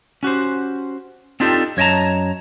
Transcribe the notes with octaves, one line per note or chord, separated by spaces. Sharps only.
C#4 F#4 G4 C5
C4 D4 D#4 F4 G4 A4
F#2 C#5 D#5 G5 A5 A#5